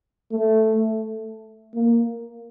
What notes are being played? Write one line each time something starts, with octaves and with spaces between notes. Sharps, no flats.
A3
A#3